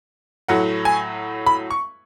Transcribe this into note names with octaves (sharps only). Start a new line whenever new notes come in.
A2 F#3 A3 F#5
G#5
B5
C#6